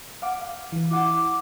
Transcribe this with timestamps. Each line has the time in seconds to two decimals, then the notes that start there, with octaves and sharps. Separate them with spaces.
0.22 F5 F#5 D6
0.41 F5
0.72 E3
0.91 E4 F#5 D6